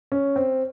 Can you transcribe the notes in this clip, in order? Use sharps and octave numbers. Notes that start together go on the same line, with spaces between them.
C#4
C4